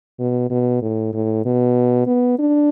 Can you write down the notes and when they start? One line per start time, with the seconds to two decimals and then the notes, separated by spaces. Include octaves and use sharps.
0.19 B2
0.50 B2
0.82 A2
1.14 A2
1.45 B2
2.07 B3
2.38 D4